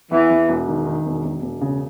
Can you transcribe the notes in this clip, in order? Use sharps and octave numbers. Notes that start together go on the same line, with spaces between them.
E2 E3
E2
E1
D#3
D#3
E1
E1
E1
C#3